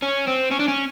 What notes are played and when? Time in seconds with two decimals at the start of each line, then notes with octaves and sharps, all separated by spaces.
0.02 C#4
0.27 C4
0.51 C#4
0.59 D4
0.68 C#4